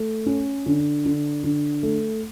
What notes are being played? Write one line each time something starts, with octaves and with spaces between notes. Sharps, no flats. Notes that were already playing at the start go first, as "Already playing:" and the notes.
Already playing: A3
C#4
D3
D3
D3
A3